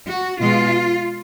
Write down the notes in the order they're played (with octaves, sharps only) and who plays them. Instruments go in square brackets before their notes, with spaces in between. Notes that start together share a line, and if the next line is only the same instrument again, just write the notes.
[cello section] F#4
B2 G#3 F4